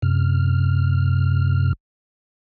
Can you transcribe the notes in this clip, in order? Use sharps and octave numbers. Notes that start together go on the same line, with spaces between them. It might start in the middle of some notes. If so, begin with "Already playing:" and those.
F#2 C3 F6